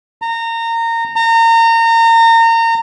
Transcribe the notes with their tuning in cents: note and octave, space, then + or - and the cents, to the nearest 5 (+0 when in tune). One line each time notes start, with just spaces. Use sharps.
A#5 -25
A#5 -30